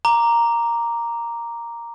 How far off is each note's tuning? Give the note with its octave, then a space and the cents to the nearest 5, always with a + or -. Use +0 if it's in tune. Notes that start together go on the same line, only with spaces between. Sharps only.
A#5 +0 D6 +0